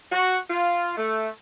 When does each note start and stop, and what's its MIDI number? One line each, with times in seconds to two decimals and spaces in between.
0.12 0.37 66
0.49 0.97 65
0.97 1.28 57